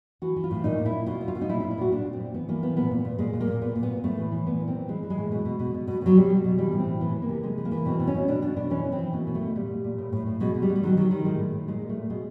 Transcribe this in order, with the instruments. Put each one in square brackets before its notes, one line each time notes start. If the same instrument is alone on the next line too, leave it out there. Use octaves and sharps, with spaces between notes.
[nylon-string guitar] E3 F#4
E3
F4
A2
A#2 D#4
A#2
E4
A#2
B2 F4
B2
F4
B2
D#4
A#2 E4
E4
A#2
E4
A#2 F#4
A#2 D4
A#2
C4
A#2
E3 B3
E3 A#3
A2 B3
A#2 B3
A#2
A#2
A#2 G#3
A#2
A#3
A#2
A#2 B3
A#2
B3
A#2
A2 A3
E3
E3
A#2 B3
A#2
C4
A#2
E3 G#3
E3
G#3
A2
B2
B2
B2
B2
B2
B2 F#3
B2 G3
B2
G3
B2
E3 G3
A2
C4
E3
E3 B3
E3
A#3
C3
C3 G#3
E3
A#3
E3
B2 C4
B2
C#4
B2
B2 D4
B2 D4
B2 D4
E3 C#4
E3
C4
E3
B2 A#3
B2
A3
B2
A#2 G3
A#2
A#2
A2
A2
A2
B2 G#3
B2
G3
B2
G3
D#3 F#3
D#3 F#3
D#3 G3
A2 G#3
A2
A2
A#2 G#3
A#2
A3
A#2
B2 G#3